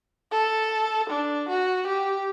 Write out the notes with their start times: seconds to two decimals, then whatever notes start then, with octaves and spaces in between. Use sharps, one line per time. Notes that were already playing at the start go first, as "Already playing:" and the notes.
0.32 A4
1.10 D4
1.49 F#4
1.87 G4